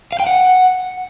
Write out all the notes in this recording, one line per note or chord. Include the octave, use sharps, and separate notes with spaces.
F5
G5
F#5